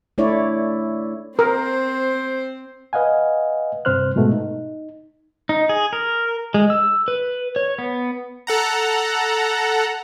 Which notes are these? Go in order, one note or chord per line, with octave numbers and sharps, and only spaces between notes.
A3 D4 E4 C#5 D5
C4 A#4 C5
B4 D#5 F5 F#5 G#5
G2 C3 C4 C5 F6 F#6
G#2 B2 G#3 A3 F#4
D#4
D#4
G#4
A#4
G#3
E6
B4
C#5
B3
A4 F#5 A#5